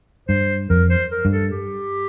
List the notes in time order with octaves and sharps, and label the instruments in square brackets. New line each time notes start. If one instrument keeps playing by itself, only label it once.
[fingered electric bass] G2 [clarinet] C5
[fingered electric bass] F2 [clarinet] A#4
[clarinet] C5
A#4
[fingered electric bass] G2
[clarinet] A4
G4